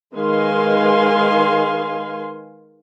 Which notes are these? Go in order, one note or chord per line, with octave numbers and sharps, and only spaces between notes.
D#3 G#3 B4 F5 G#5 C6